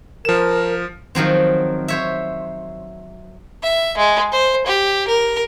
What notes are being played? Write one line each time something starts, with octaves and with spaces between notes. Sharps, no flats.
F3 A#4 E7
D#3 F3 F#3 C4
C5 C#5 E5
E5
G#3
C5
G4
A#4